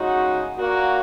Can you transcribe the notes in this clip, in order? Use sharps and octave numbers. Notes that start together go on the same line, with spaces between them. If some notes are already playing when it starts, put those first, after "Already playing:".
Already playing: C#3 G#3 D#4 F#4
A#2 A#3 F#4